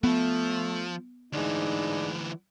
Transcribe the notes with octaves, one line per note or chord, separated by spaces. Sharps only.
F3 A3 B3
D2 G#2 E3 D4 D#4